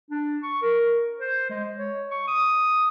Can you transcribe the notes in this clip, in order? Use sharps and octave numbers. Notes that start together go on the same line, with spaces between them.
D4
C#6
A#4
C5
G#3
C#5
C#6
D#6